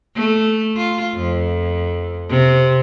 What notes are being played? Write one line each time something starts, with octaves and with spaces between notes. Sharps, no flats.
A3
F4
F2
C3